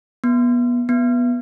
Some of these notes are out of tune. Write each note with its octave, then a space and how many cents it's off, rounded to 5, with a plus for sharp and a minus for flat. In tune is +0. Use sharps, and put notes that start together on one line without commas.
B3 -25
B3 -15